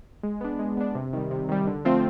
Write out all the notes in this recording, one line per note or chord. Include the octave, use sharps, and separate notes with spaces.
G#3
B3 D4
G#3
B3 D4
C3
D#3 G3
C3
D#3 G3
D3
F3 A3 C4 F4